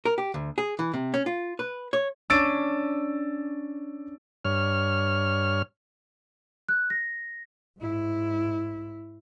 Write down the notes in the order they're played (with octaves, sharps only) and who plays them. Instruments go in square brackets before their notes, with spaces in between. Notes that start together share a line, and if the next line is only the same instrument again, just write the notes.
[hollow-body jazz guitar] A#4
G4
D2
G#4
E3
C3
C#4
F4
B4
C#5
[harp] C#4 D4 [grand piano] E6 A6 D7
[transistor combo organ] G2 C#5 F6
[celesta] F#6
A#6
[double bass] G#2 E4